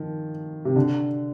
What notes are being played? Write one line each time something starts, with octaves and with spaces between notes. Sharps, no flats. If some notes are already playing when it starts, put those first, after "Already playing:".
Already playing: D#3 F3
C3
D3